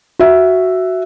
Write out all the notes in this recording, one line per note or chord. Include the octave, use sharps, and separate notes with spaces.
F#4 E5